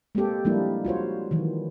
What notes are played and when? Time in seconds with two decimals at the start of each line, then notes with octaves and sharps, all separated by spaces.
0.15 G#3 A#3 C4 G4 A4
0.45 F3 G3 G#3 A#3 D4 E4
0.85 F4 F#4 C5 C#5
1.31 D#3 E3 F#3